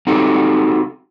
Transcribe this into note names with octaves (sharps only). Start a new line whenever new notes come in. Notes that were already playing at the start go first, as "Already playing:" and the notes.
C4 D#4 F#4 G4 A4